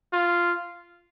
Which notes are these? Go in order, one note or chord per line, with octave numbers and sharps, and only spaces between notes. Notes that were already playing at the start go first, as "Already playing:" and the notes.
F4